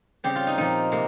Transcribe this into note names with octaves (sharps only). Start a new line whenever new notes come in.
C#3 G3 C4 G4
F4
D#4
A#2 F3 C4 D#4
C3 A#3